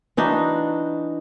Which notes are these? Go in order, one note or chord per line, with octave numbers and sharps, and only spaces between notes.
E3 D4 D#4 F#4